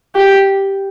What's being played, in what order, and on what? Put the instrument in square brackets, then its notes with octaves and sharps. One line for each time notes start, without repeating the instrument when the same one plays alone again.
[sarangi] G4